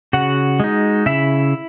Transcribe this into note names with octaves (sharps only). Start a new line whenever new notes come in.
C#3 F#4 F#5
G#3 D#4
C#3 E4 E5